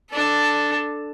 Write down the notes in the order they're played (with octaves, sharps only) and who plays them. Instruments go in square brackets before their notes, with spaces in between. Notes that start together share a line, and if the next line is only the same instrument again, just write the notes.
[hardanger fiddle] D4 A4